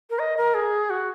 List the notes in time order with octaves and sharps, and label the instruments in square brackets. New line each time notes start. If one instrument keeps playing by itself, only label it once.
[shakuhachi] A#4
D#5
A#4
G#4
F#4